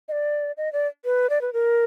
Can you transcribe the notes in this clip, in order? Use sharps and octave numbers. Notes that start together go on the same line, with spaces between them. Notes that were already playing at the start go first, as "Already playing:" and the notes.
D#5
D5
D#5
D5
B4
D5
B4
A#4